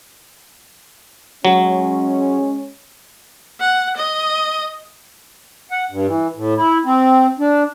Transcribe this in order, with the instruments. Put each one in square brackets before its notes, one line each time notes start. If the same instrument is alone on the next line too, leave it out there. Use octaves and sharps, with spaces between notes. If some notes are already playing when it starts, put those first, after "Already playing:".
[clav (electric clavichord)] F#3 [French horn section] G#3 C#4
[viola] F#5
D#5
[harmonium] F#5
G2
E3
A2
E4
C4
D4